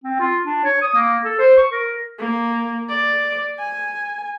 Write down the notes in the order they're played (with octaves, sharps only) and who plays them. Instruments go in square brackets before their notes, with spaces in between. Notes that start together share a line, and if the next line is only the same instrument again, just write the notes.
[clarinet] C4
F4
D4
C#5
D#6
A#3
A4
C5
C#6
A#4
[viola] A#3
D5
G#5